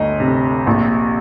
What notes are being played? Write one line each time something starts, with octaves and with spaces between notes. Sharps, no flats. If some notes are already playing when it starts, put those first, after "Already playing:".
Already playing: G1 D2 D#5
C3
A#1